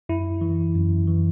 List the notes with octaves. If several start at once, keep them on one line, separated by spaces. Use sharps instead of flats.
F#2 E4
E3
F#2
E3